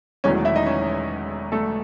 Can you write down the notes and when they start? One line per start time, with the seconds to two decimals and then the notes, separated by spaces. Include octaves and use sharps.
0.24 E1 E2 D#3 F#3 A3 C#4 C#5
0.45 E4 E5
0.56 D#4 D#5
0.66 C#4 C#5
1.52 A3 A4